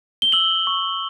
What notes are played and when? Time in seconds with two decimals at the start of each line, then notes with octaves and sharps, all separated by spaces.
0.22 G7
0.32 E6 F#7
0.67 C#6